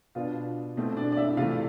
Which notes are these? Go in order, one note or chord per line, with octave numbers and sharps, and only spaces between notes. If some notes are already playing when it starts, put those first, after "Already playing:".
B2 B3 D4 F4 F5
B2 A3 C4
D4 D5
D5
E4 E5
C3 E3 A3 F4 F5